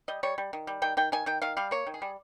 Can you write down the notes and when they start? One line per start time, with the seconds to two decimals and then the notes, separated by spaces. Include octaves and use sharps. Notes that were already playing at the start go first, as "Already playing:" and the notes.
0.08 G3 D#5
0.23 G3 C#5
0.38 G3
0.53 D#3
0.67 G3
0.82 D#3 G5
0.97 D#3 G5
1.12 D#3 G#5
1.26 D#3 G5
1.42 D#3 F5
1.57 G3 F5
1.71 A#3 C#5
1.87 D#3
1.94 G#4
2.02 G3